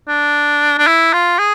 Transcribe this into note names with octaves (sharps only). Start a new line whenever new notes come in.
D4
D4
E4
F4
G#4